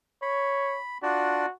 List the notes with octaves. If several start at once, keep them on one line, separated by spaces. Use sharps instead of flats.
C#5 B5
D4 F4 F#4 D5